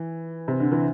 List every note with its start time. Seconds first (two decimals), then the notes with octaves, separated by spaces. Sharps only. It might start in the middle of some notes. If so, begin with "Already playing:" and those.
Already playing: E3
0.48 C3
0.60 D3
0.72 E3